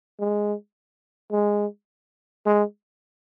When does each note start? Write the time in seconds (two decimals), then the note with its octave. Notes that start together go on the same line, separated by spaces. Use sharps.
0.20 G#3
1.32 G#3
2.46 G#3